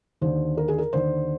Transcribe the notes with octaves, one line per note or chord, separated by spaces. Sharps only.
D#2 D3 C5
A#4
G#4
A#4
D#2 D3 C5